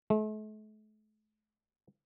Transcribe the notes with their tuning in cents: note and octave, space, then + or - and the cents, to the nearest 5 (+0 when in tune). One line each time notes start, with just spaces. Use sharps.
A3 -40